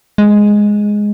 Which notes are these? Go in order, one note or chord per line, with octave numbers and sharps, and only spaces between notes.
G#3